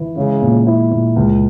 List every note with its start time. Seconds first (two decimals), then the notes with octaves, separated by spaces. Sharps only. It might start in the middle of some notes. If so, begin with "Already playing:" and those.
Already playing: E3
0.16 C#3 G#3
0.42 A#2
0.66 E4
0.91 A#2
1.16 C#2